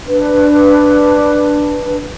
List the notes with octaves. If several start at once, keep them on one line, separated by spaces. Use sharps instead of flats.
D4 B4